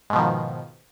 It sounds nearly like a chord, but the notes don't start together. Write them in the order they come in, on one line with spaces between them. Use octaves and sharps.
G#2 B2 F3 D#3